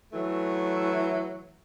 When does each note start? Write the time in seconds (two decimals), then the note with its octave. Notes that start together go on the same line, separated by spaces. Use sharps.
0.12 E3 F#3 A3